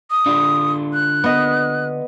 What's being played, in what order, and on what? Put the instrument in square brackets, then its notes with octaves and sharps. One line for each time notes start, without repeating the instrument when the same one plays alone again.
[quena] D#6
[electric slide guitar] D3 D4 F4
[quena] F#6
[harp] B3 D#5